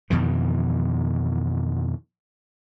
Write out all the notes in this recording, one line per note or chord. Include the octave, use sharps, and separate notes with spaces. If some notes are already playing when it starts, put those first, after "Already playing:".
F2 B2 D#3 E3